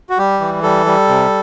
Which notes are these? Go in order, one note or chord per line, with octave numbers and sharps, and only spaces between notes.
F#4
G3 G4
E3
G3 A4
G3
C3